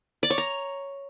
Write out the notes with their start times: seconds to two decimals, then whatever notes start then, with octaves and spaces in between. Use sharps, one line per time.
0.23 D5
0.30 C#5
0.38 A#5